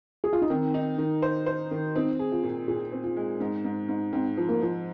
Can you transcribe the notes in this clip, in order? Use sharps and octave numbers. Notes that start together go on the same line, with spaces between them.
G#4
F4
D#4
D#3 C4
D#4
D#3
C5
C5
D#3
C4 D#4
G#4
F4
A#2
A#2 G#4
C4
F4
G#3
G#2
G#2
G#2
G#2 C4
F3
A#3
F3